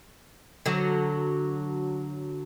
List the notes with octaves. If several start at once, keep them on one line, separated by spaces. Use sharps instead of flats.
D3 F#3